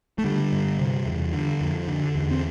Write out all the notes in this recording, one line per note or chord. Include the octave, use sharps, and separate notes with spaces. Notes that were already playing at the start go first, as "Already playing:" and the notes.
A3
D3 G3
G2
C3
E2
D3
F2
D3
E2
C4